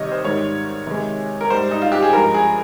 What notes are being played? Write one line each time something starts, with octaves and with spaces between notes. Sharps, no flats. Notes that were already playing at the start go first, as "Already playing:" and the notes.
Already playing: C3 D#3 G3 C#5 D#5
C5
G#2 D#3 G3 C#5
C3 D#3 G#3
A#4
G#2 G3 C5
D#4
F4
G4
G#4
G2 F3 G#3 A#4
G#4